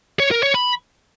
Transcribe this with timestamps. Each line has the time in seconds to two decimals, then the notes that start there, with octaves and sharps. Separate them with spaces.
0.20 C#5
0.31 A#4
0.43 C#5
0.55 B5